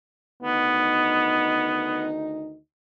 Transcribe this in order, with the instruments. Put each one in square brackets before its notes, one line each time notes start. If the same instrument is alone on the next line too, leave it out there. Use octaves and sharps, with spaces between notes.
[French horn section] D2 D#3 D#4 [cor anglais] B3